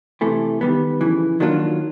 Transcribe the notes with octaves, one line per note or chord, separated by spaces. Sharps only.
C3 E3 A3
D#3 G3 B3
F2 C#3 E3
D#3 F#3 A#3 D4 F4